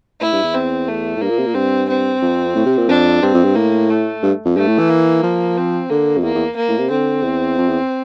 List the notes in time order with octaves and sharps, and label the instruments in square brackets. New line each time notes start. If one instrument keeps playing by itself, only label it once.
[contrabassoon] A2 [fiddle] E4
[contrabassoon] G2
E2
[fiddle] C4
A3
[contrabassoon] A2
[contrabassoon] G2 [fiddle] A#3
[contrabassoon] A#2
C3
A#2
[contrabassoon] G2 [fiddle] C4
[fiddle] C4
[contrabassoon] F2
A2
C3
A#2
[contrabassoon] F2 [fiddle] D4
[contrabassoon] G2 [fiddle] C4
[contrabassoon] F2
G2
[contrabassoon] A2 [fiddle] A#3
[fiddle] A3
[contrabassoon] G2
F2
[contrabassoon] G2 [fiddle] A3
[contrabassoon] A2
E3
[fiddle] A#3
[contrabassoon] F3
[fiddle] C4
[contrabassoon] D3 [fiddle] A#3
[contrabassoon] F2
[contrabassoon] E2 [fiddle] A#3
[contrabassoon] E2
[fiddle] A#3
[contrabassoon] A2
C3
[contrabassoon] D3 [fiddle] C4
[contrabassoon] E2
F2
E2